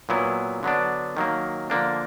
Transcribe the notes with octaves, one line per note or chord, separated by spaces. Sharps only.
A#2 F#3 B3 E4
D3 F#3 B3 D4
D#3 F#3 A#3
D3 F3 A#3 D4